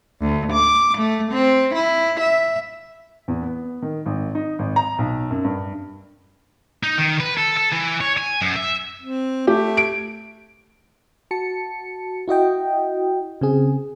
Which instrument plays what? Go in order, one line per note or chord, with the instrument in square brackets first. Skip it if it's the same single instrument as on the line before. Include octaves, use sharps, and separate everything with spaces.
[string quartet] D2
D6
A3
C4
E4
E5
[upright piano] E2
B3
D#3
G#1
D#4
G#1
A#5
B1
F#2
G2
[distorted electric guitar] D#4
D#3
B4
A4
A4
E3
C#5
G#5
F#2
E5
[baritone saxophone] C4
[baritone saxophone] A3 [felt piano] G4
[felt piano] D7
[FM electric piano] F#4 A5 C#7
E4 F#4 D#5 G5
C#3 C4 G#4